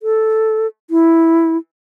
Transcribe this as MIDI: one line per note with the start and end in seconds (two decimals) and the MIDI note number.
0.03 0.67 69
0.90 1.57 64